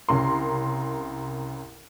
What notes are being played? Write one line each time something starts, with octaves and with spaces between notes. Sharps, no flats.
C2 C#3 A#4 C6